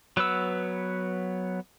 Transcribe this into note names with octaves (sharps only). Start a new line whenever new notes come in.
F#3 B3 B4 E6